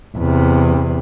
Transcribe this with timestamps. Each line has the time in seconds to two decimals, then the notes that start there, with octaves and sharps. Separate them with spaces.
0.16 E2 C3